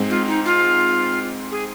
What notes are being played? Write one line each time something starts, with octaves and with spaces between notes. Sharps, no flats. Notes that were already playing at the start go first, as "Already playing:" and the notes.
Already playing: G#2 G#3 C4
F4
D#4
F4
G#4